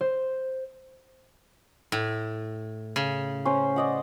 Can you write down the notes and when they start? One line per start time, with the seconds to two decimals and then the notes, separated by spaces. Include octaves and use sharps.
0.01 C5
1.92 A2
2.96 C#3
3.45 C#4 C5
3.76 D5 D#5 F#5